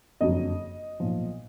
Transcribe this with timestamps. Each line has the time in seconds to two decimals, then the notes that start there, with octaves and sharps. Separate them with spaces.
0.21 F#1 F2 D3 F#3 D#5
1.00 B1 A#2 F3